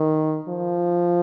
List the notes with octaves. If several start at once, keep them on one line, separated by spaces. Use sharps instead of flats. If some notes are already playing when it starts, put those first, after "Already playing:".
Already playing: D#3
F3